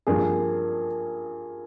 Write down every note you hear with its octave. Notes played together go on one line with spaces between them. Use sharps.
G2 F3 A#3 G#4